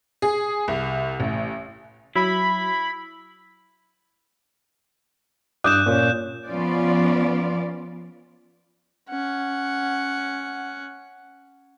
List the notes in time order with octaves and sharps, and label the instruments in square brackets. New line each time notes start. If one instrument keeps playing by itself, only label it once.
[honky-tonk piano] G#4
C2
A1
[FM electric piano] F#3 [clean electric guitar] E4 [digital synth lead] B5
[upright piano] G2 D6 D#6 [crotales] F#6 G6 E7
[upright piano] A#2 C#4
[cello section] F3 B3 C#4 F4 D5
[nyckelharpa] C#4 F#5